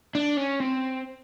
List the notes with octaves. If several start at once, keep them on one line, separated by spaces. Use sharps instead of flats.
D4
C#4
C4